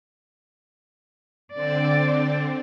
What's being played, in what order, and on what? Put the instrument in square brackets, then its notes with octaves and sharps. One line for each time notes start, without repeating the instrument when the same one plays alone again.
[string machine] D3 C4 [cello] D5